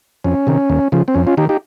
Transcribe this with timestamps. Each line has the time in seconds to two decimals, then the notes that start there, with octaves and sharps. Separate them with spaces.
0.24 F2 C#4
0.47 C3 D#3
0.70 D#2
0.92 C#3 F3
1.08 C4
1.14 F2 C#4
1.27 C#4 F4
1.37 D#3 D#4 G4
1.49 D#4 G4